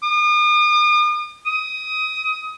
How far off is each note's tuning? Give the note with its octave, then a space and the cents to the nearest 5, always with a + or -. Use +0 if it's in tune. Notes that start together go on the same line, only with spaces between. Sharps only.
D#6 -45
D#6 +20